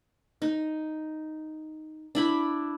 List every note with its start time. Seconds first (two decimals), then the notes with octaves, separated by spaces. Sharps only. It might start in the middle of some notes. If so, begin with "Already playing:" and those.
0.42 D#4
2.15 D4 E4 B5